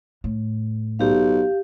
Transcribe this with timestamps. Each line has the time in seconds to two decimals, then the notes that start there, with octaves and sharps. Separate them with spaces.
0.24 A2
0.99 B1 G4 F5